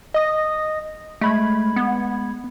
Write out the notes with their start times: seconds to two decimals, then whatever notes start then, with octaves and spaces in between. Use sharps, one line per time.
0.14 D#5 D#6 A#6
1.21 G#3 A3 B5 G#6
1.76 B3